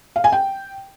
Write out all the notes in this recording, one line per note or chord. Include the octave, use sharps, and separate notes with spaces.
F5
G#5
G5